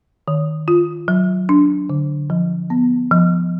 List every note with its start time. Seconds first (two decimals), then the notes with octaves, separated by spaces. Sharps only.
0.28 D#3
0.68 F4
1.08 F#3
1.49 D4
1.90 D3
2.30 F3
2.70 B3
3.11 F3